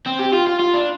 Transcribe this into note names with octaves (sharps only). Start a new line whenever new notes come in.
C4
G4
F4
F4
F4
D4